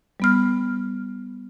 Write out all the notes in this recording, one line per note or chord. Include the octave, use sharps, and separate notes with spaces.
G3 B3 F6